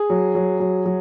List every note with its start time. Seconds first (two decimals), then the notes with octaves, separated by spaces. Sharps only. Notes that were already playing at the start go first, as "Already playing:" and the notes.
Already playing: G#4
0.10 F#3
0.35 F#3
0.60 F#3
0.86 F#3